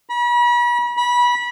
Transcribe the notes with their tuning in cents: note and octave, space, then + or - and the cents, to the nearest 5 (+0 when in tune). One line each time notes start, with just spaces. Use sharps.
B5 -40
B5 -25